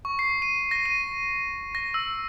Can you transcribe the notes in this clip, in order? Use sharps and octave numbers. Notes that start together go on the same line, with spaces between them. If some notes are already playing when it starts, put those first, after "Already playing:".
C#6
C7
D#7
A#6
D#7
A#6
E6